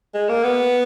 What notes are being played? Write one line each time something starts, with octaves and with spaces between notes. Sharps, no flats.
G#3
A#3
B3